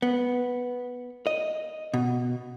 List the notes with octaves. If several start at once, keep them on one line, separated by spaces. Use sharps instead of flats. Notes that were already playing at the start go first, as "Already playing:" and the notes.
B3
D#5
B2